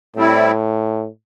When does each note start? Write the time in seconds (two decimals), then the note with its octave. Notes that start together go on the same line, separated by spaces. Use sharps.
0.16 A2 G3 C4 E4